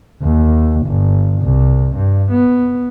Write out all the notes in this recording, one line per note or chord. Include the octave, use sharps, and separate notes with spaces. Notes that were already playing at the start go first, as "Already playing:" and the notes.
D#2
G1
C2
G2
B3